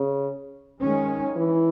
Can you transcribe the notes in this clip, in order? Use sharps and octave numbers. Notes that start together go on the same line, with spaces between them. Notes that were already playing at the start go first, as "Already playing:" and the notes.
Already playing: C#3
D#3 G#3 C#4
E3